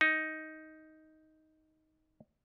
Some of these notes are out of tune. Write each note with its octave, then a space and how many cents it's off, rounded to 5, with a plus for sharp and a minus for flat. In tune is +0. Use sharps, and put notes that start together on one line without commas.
D#4 +10